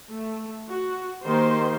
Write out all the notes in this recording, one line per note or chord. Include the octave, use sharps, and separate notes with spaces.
A3
F#4
D#3 A#3 G4 C5 C6